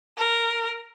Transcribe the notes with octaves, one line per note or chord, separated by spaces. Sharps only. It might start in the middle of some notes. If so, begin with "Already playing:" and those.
A#4